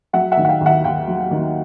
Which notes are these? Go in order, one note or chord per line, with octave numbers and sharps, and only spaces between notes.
F#3 E5 F#5
E5 F#5
D#3
F#5
F5 G5
D#2
E5 F#5
D#2 F5 G5
F#3
D#3